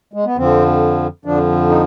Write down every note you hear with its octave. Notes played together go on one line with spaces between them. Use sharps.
G#3
B3
F2 D3 F3 C4
F2 D3 F3 D4
D#4